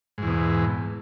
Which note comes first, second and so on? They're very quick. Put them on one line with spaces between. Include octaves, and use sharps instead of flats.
G#2 E2 B2